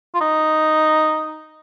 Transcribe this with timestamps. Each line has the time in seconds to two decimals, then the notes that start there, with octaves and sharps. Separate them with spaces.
0.14 F4
0.21 D#4